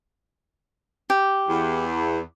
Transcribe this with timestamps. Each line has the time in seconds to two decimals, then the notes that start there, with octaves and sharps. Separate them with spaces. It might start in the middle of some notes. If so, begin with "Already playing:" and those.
1.10 G4
1.48 E2